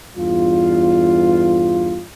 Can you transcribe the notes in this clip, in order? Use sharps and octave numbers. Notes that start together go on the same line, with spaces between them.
E2 G2 F4